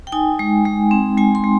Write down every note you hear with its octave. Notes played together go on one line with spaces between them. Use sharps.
G5
D#4 G#5
G#3
G#3
C4
G#3 G#5
C6
G#3